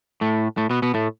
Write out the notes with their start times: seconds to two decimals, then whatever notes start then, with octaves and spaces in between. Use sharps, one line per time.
0.21 A2 A3
0.57 A2 A3
0.70 B2 B3
0.82 B2 B3
0.94 A2 A3